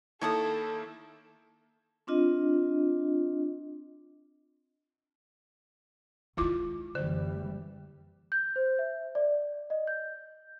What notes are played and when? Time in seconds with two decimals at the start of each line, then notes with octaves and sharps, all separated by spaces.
0.21 D#3 A#3 E4 A4 C#5 A5 D#6
2.07 C4 D4 F4 D#5
6.37 D#3 G#3 E4 F4 D6
6.95 F#1 D3 E3 G3 C5
8.32 G6
8.56 C5
8.79 E5
9.15 D5
9.70 D#5
9.87 G6